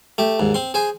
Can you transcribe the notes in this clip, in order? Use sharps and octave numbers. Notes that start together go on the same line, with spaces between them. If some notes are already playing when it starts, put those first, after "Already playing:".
A3 G4
D#2 G#2
C4 C6
G#4 C5 G#5